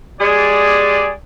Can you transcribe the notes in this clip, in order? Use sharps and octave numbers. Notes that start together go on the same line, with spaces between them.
G#3 G4 G#4 D5